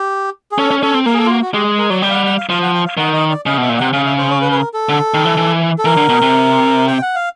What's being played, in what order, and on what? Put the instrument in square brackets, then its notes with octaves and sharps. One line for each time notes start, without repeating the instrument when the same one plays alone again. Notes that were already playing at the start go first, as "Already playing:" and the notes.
Already playing: [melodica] G4
G#4
[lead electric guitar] C#4 [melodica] A4
[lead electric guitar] C#4
[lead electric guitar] C#4 [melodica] A4
[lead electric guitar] C4
[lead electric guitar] A#3 [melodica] A#4
[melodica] G#4
A4
F4
F#4
F#4
[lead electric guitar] G#3 [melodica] G4
[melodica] A#4
[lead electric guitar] F#3 [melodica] D5
[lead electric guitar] G3 [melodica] G5
[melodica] F5
F#5
F#5
F5
[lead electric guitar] F3 [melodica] F5
[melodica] F#5
G5
F5
[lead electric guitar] D#3 [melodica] F#5
[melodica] D#5
D5
[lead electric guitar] C#3 [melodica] D#5
[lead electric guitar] B2 [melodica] E5
[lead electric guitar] A#2
[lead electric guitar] C3 [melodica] F#5
[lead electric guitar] C#3 [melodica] F5
[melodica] E5
C5
C#5
B4
B4
A#4
A4
[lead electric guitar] D3
D#3
E3
E3
[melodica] A4
[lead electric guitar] E3 [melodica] A#4
[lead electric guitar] D3
B2
C3
[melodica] G5
F#5
F5